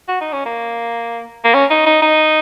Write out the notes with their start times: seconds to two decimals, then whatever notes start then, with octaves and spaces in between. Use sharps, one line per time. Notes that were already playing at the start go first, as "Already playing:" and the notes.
0.08 F#4
0.21 D#4
0.33 C#4
0.46 A#3
1.45 A#3
1.54 C#4
1.71 D#4
1.86 D#4
2.02 D#4